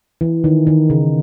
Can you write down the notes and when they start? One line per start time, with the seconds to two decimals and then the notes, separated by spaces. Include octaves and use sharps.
0.21 E3
0.44 D#3
0.67 D#3
0.90 C#3